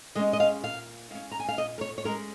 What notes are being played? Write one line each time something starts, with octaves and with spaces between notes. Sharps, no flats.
G#3 C#4 D#5
D#5
F5
A#2 F5
G#3 C#4 F5
A#5
G#5
F5
A#2 D#5
A#4
C#5
C#5
G#3 C#4 A#4